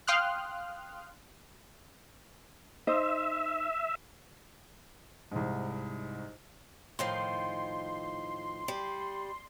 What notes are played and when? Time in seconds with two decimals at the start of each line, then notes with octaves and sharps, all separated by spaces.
0.07 F5 G5 C6 D#6 F6 F#6
2.87 D#4 C5 D#5 E5
5.31 C2 G#2
6.99 A2 D#3 F3 C6
8.68 G3